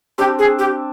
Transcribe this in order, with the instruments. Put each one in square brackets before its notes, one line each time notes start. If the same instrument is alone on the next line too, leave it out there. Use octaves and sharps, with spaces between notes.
[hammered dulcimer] C4 D4 [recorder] G4
[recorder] G#4
G4